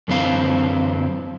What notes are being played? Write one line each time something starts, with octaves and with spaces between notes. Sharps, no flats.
F#2 D3 E3 C4 F5